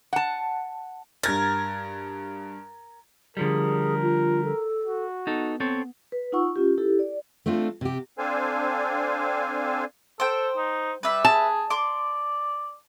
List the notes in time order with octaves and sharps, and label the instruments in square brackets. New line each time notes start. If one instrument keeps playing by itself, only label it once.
[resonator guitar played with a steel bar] F#5 A5
[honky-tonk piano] G2 G#6 A6 [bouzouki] A#4
[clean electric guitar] D3 F3 G3 [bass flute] G#4 [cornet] A#4
[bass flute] F4
A4
[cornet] F#4
[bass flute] B3 [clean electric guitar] D#4 A4
[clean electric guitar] C4 A4 C#5
[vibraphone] B4
D#4 F4 F#5 C#6 E6
C#4 F4 G4
E4 G4 A4
D5
[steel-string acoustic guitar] A3 C4 D4 F4
C3 G4
[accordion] C4 D4 A4 C5 F5 G#5
[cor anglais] A4 [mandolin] C5 G5
[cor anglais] D#4
[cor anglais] G3 [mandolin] B4 E5
[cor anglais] G#4 [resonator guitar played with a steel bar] A5
[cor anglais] D5 [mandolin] C6 D6